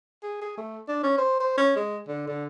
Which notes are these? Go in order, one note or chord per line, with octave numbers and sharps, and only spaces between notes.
G#4
G#4
A3
D4
C#4
C5
C5
C#4
G#3
D3
D3